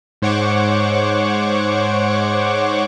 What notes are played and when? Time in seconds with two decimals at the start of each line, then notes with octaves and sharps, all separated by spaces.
0.22 G#2 C5 C#5 F#5 C#6 D6